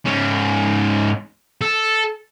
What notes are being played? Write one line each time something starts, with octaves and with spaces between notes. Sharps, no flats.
G#2 C#4
A4